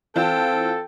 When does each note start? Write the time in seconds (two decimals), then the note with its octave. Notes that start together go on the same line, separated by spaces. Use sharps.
0.16 E3 C4 F4 A4 G5 A5